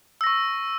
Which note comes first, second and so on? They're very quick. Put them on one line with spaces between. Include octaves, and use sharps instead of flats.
E6 A#6 C#6